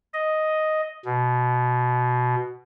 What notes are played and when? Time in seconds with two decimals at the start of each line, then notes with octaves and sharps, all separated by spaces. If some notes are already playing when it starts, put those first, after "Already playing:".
0.14 D#5
1.05 B2